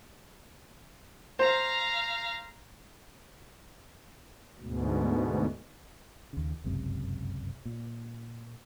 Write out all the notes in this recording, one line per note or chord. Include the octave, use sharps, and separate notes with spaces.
C5 F5 A#5
D2 G#2 B2
D#2 C#3
G1 C#2 F#2 C3
A#2